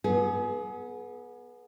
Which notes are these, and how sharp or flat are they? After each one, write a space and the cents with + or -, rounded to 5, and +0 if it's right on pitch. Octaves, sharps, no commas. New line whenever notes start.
B3 -20 G#4 +30